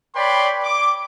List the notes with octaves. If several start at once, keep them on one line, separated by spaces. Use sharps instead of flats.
B4 C#5 D5 G5 B5 C6
D6